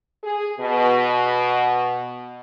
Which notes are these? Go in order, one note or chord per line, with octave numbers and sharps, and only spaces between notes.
G#4
B2